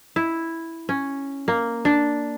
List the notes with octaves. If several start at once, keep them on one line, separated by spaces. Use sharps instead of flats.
E4
C#4
A#3
D4